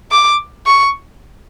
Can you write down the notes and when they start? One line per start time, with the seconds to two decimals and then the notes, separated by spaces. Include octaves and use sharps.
0.11 D6
0.66 C#6